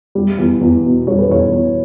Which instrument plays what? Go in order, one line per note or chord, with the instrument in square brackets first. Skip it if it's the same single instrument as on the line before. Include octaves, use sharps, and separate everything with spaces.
[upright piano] G3
E2
E2
B2
G3 C#5
B4
E2 C#5
E2